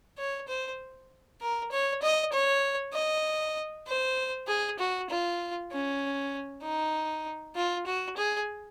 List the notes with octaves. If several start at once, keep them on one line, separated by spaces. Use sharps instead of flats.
C#5
C5
A#4
C#5
D#5
C#5
D#5
C5
G#4
F#4
F4
C#4
D#4
F4
F#4
G#4